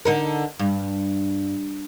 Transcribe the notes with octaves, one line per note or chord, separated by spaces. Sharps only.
D3 D#4 A#4
G2